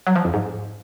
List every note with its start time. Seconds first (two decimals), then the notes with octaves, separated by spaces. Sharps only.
0.07 F#3
0.16 F3
0.25 F2
0.34 G#2